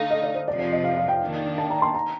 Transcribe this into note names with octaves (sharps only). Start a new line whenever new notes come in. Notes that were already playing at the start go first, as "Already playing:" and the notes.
Already playing: D3 A3 D#4 F5
D#5
D5
C5
F2 C3 F3 D5
D5
D#5
F5
F5
G5
D#3 A#3 D4
A5
A#5
C6
A#5